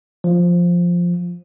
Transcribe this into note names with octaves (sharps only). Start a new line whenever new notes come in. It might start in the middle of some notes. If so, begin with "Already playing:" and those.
F3